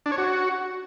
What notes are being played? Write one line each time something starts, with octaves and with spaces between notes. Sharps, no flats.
D4
C#5
F#4